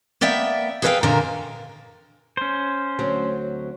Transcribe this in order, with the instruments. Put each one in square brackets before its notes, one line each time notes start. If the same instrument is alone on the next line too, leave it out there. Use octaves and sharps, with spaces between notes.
[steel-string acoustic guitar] A#3 B3 D5 E5 G5
G#4 A4 B4 C5 F5 G5
A#2 D3 D#3 A#3 G#5 A#5
[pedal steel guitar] C#4 C5
[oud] D2 F#3 C4